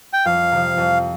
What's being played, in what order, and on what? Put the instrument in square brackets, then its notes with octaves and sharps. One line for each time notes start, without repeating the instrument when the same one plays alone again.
[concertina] G5
[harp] F2 [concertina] F5
[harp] C3 F3
F2